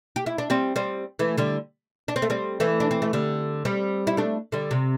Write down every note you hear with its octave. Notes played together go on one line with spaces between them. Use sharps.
G4
E4
D4
G3 C4
G3 C4
E3 A3
D3 G3
D4
C4
A3
G3 C4
E3 A3
D4
C4
A3
D3 G3
G3 C4
E4
A3 D4
D3 G3
C3